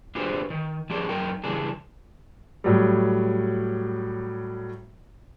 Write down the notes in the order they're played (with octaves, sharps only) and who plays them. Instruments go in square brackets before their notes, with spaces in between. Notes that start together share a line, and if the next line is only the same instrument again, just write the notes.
[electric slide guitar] D4 F4 G4 G#4 B4 C5
D#3
F3 C#4 D4 G4 G#4 D5
F#2 D#4 A#4 G5
C#3 E3 G3 D4 G#4
[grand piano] A2 F#3 G3